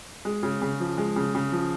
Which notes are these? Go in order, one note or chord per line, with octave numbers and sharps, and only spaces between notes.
G#3
C#3
C#3
F3
G#3
C#3
C#3
F3